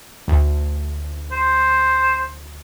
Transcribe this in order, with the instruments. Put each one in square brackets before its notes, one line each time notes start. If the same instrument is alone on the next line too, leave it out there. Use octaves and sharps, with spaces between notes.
[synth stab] D2
[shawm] C5